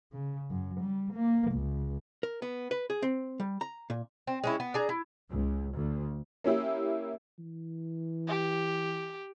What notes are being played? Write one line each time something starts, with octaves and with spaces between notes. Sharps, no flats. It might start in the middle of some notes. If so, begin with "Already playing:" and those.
C#3
F#2
G3
A#3
C#2
A#4
B3
B4
G#4
C4
G3
A#5
A#2
C4
G#3 C#4 E4
B3
D4 G#4 A#5
E4
C#2
D2
A#3 C#4 E4 G4
E3
G4